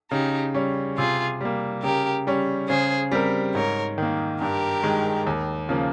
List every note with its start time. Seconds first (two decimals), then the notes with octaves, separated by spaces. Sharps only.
0.11 C#3 D#4 G4
0.54 G3 C#4
0.97 C3 F4 G#4
1.41 G3 A#3
1.83 C#3 G4 A#4
2.27 G3 C#4
2.69 C#3 G#4 C5
3.11 G3 C4 G4 A#4
3.55 G#2 A#4 C#5
3.98 D#3 A#3
4.41 G2 G4 A#4
4.83 D#3 G#3
5.27 D#2
5.69 C#3 F3 A#3